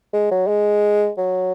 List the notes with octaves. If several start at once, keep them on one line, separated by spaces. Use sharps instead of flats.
G#3
F#3
G#3
F#3